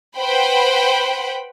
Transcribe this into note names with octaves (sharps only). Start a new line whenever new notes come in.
B4 C5 F#5 G5 B5